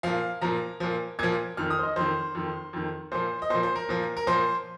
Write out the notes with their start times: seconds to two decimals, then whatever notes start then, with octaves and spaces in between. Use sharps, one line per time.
0.03 A#2 F3 F5
0.41 A#2 F3 A#5
0.80 A#2 F3
1.19 A#2 F3 G#6
1.57 F2 D#3 F6
1.70 D#6
1.79 C5
1.83 D#5
1.96 F2 D#3 C5
2.35 F2 D#3
2.73 F2 D#3
3.12 A#2 F3 C5
3.42 D#5
3.50 A#2 C5
3.55 F3
3.63 C5
3.76 A#4
3.89 A#2 F3
4.17 A#4
4.27 A#2 F3 C5